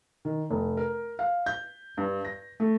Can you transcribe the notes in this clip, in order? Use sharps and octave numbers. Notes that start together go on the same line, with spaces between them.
D#3
F1
A#4
F5
G6
G2
A#6
A3